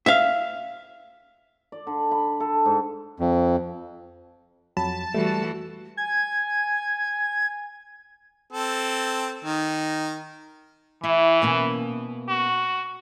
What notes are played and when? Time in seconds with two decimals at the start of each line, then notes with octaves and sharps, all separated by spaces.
0.06 E5 F5
1.72 D5
1.87 D3
2.11 B5
2.40 A4
2.65 G#2
3.20 F2
4.77 F2 F#3 A5 B5
5.15 E3 G3 A3 F#4
5.97 G#5 G#6
8.52 C4 A4
9.45 D#3
11.04 E3 E4
11.42 B2 A#3 C#4
12.28 F#4